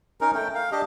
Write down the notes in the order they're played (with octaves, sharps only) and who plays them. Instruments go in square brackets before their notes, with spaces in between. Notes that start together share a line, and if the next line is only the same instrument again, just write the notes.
[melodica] C#4 D#4 A#4
A3 G5
F5
D4 G4 D#5